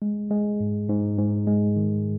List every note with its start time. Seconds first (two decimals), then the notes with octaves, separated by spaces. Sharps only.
0.02 G#3
0.31 G#3
0.60 G#2
0.89 G#2
1.18 G#2
1.47 G#3
1.76 D#3